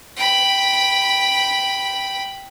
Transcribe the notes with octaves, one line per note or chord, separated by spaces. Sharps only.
G5 B5